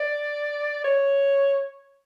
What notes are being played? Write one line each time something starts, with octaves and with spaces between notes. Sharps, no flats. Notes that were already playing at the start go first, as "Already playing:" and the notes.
Already playing: D5
C#5